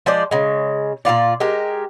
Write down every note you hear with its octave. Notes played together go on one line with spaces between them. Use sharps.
F3 G#3 C5 D5
C#3 G#3
A#2 F3 F4 D5
G#3 G4 A#4